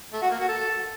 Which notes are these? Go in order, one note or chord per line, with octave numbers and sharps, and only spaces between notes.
A3
F#4
A#3
F#4
A4